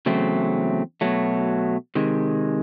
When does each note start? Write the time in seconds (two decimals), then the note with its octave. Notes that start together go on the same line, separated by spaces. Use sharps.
0.06 E2 C#3 F#3 A3 C4
1.01 B2 F#3 A3
1.95 C3 D#3 G#3